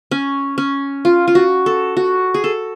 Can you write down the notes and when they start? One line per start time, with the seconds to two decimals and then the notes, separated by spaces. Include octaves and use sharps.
0.11 C#4
0.58 C#4
1.05 F4
1.28 F4
1.35 F#4
1.66 A4
1.97 F#4
2.34 G#4
2.44 A4